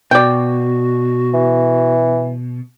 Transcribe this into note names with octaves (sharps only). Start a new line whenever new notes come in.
B2 F#4 D5 G5
E3